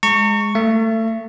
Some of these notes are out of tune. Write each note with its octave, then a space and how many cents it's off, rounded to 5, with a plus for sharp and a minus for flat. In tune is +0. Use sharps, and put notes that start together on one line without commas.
G#3 +0 A#5 -40 C#6 +0
A3 +25 E5 +40